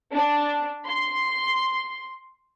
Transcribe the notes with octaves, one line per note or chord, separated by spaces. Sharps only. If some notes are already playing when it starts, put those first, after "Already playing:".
D4
C6